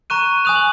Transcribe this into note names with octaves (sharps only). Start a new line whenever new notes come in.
A#5 C#6 F#6 D#7
G#5 D#6 F#6 F7
F#7